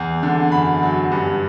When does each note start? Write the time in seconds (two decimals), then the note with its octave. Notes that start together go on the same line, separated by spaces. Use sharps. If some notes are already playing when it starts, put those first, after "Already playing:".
Already playing: E2
0.23 D3
0.52 F#2 B5
0.82 F#3
1.12 G2